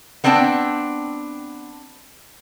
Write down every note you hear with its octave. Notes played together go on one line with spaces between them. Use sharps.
B3 C4 D4 G5 A5